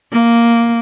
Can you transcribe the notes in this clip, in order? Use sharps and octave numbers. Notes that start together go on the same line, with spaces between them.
A#3